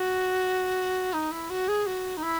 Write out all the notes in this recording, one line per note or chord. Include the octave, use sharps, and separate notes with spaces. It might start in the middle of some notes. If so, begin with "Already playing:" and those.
Already playing: F#4
D#4
E4
F#4
G#4
F#4
D#4
E4